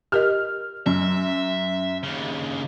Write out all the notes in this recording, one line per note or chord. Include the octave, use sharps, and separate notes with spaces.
G4 A#4 D#5 F6
F#2 F#3 E5
D#2 C#3